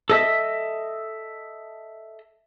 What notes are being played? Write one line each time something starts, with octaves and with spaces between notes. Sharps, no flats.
A4 D#5 E5